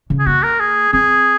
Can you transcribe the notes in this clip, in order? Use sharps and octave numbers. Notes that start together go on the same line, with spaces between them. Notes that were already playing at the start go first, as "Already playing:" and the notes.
C#3
G#4
A#3 F#4
A#4
G#4
C4 G#4